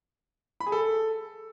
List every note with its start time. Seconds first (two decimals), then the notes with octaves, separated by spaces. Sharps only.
0.60 B5
0.66 G#4
0.72 A4